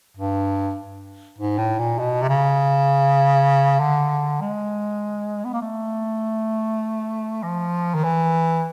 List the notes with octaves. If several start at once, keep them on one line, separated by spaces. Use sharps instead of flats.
G2
G#2
A2
A#2
B2
C3
C#3
D3
G#3
B3
A#3
A3
F3
D#3
E3